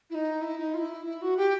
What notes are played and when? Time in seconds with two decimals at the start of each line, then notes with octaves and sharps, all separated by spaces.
0.10 E4
0.15 D#4
0.41 E4
0.58 D#4
0.74 F4
0.78 E4
1.05 E4
1.22 F#4
1.37 G4